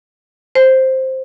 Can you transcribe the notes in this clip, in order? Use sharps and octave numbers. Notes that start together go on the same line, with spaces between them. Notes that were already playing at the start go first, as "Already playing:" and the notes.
C5